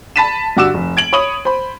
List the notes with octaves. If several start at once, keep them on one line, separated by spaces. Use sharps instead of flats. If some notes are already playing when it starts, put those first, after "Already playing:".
A5 B5 A6 B6 D#7 E7
G2 D3 F#4 D6 E6 E7
F1
G#6 D7 F#7
C#5 B5 D#6 D#7 F#7
C5 B5